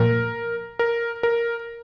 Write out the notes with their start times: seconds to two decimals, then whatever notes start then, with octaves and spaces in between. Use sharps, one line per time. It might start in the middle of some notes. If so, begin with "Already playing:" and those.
Already playing: A#2 F3 A#3 A#4
0.79 A#4
1.23 A#4